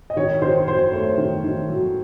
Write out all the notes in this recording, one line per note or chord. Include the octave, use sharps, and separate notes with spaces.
D#5
D#3 C#5
D#3 C5
F#3 C5
A3 C#5
D#3
D#3
F#3